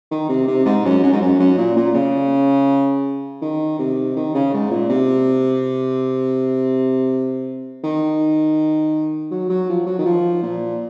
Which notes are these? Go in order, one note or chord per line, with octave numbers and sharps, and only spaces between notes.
D#3
C3
C3
G#2
F#2
F#2
G#2
F#2
F#2
A#2
A#2
C#3
D#3
C3
D#3
C#3
G#2
A#2
C3
D#3
F#3
F#3
F3
F#3
D#3
F3
A#2